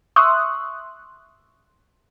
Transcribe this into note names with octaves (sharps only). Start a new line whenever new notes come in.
E5 C6 C#6 D#6 E6 F#6